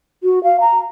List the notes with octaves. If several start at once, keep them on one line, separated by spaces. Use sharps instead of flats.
F#4
F5
A#5